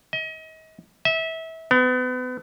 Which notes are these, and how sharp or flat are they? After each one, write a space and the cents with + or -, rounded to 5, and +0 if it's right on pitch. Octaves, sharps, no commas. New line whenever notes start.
D#5 +35
E5 -25
B3 +35